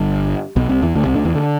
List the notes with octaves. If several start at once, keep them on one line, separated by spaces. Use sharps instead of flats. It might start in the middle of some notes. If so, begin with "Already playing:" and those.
Already playing: G1 G2
B1 B2
C2 C3
E2 E3
D2 D3
C2 C3
D2 D3
E2 E3
D3